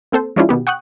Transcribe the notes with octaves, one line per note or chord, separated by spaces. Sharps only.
A#3 C4 A4 C5
F3 G#3 C#4 D4 E4 F4
B2 D#3 B3 G4
F#5 G5 C#6 D#6 F#6